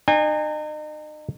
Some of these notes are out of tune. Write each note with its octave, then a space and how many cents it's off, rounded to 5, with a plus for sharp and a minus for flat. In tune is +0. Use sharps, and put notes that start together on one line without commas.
D#4 -35 G#5 -35